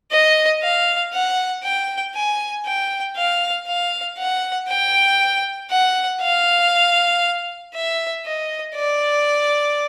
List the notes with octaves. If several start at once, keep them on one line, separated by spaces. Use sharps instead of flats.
D#5
F5
F#5
G5
G#5
G5
F5
F5
F#5
G5
F#5
F5
E5
D#5
D5